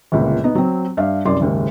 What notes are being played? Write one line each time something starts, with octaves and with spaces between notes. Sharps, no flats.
G1 C#2 A#2
B3 D#4
F#3 C4
G2 E5 F5
C2 F#2 D5 C6
F#1 D#2 G#2